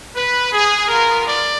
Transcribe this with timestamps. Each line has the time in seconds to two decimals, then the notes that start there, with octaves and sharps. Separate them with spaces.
0.16 B4
0.53 G#4
0.88 B3 F4 A#4
1.26 D5